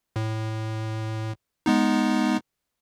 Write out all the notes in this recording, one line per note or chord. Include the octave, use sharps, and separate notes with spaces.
A2
G#3 B3 D#4